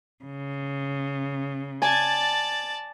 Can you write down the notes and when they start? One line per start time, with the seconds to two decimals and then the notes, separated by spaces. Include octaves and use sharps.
0.25 C#3
1.82 D5 G#5 A5